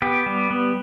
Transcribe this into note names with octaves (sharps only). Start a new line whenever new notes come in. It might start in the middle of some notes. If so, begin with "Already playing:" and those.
B3 G4
G3
B3